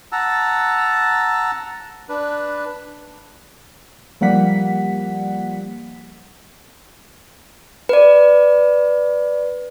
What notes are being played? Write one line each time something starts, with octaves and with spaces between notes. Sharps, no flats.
F#5 A5 A#5 E6
D4 B4
F3 G3 A#3 F#5 B6
B4 D5